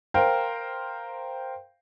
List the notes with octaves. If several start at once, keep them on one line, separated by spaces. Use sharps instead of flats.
A#4 C5 F5 G5